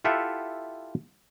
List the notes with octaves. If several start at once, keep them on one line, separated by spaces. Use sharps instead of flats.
E4 F4 G4 A4 E5 F#5